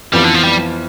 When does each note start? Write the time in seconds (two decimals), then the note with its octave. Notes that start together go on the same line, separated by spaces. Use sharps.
0.13 F2 E3 G3 B3 F4
0.24 D3
0.34 F3
0.44 G3